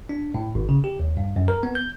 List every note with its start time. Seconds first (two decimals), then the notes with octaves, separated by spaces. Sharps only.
0.09 D4
0.34 A2
0.55 G#1
0.69 C#3
0.84 G4
1.00 D#2
1.17 G2
1.36 F#2
1.48 A#4
1.63 B3
1.75 G6